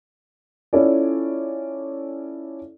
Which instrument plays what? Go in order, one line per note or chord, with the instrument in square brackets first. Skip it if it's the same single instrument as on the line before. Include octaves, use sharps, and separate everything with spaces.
[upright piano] C#4 E4 F4 A4 C#5 D5